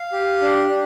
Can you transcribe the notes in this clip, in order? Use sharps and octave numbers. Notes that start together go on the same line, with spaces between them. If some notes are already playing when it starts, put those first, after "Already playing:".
Already playing: F5
G4
D4
D4